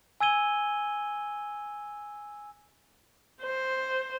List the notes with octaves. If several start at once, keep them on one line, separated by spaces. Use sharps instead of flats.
G#5 E6 G#6 D#7 G7
C5